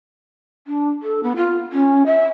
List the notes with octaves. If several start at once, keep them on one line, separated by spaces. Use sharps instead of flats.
D4
A4
B3
F4
C#4
E5